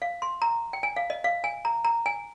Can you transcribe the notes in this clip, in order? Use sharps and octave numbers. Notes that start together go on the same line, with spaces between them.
F5
C6
A#5
G5
G#5
F5
D#5
F5
G#5
A#5
A#5
G#5